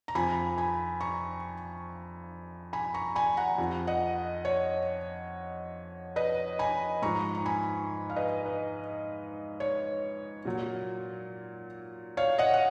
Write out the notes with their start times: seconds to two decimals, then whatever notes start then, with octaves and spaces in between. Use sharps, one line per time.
0.08 A#5
0.15 F2 F3 G#5 B5
0.58 G#5 B5
1.01 A#5 C#6
2.73 G#5 B5
2.94 A#5 C#6
3.16 G#5 B5
3.37 F#5 A#5
3.58 F2 F3
3.87 D#5 F#5
4.45 C#5
6.16 B4 D#5
6.59 G#5 B5
7.02 G#2 F3 A#5 C#6
7.35 A#5
7.46 G#5 B5
8.10 F5
8.16 B4 D#5
8.46 B4
9.60 C#5
10.45 A#2 F#3
12.17 C#5 F5
12.38 D#5 F#5
12.54 F#5